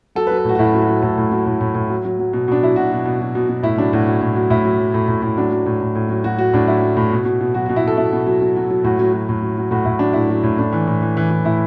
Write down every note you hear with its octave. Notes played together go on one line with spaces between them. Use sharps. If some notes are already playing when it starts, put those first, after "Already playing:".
F#3 A4
B4
F#3
B4
A2 F#4
F#4
A2 E4
F#3
F#4
F#3
A2 A4
A2
F#3
A2
A2
A2
F#3
F#3
F#3
B2
B2 D4
F#3 E4
B2 F#4
B2
B2
F#3
B2
B2
A2 E4
F#3 D4
A2 F#4
F#3
A2
F#3
A2 E4
F#3
F#3
A2
A2
A2
F#3 D4
F#3
A2
A2
A2
F#3
F#3 F#4
F#3 F#4
A2 D4
F#3 E4
F#3
A2
B2
B2
B2
F#3 F#4
B2 F#4
E4
B2 A4
B2 E4
B2
F#3
F#3
F#3
F#3
A2 F#4
F#3
F#3
A2
F#3
F#3
A2 F#4
A2 E4
F#3 D4
A2 E4
F#3
A2
A2 D4
E3
A2
E3
E3
E3
A2 E4